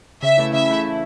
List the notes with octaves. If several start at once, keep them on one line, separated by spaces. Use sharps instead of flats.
C#3 E5
E3 A3 E4
C#3 E5
E3 A3 E4
C#3